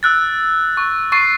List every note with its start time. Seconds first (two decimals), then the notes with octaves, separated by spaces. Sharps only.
0.03 E6 F#6 A6
0.77 C#6
1.12 C#6 A6 C7 D#7